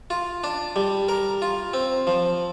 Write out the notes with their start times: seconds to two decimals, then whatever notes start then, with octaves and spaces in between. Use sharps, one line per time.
0.10 F4
0.44 D4
0.76 G3
1.09 A#4
1.42 F4
1.74 C4
2.07 F3